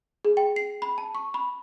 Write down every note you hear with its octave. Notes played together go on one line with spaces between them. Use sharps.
G#4
G5
C7
B5
A5
C#6
B5